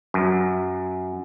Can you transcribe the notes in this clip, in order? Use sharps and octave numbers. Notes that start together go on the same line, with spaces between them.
F#2